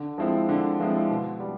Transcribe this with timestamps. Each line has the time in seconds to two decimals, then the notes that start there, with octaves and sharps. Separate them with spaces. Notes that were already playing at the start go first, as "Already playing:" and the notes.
Already playing: D3
0.18 F3 G#3 C4 E4
0.49 D3
0.80 F3 G#3 C4 E4
1.10 B2
1.40 G3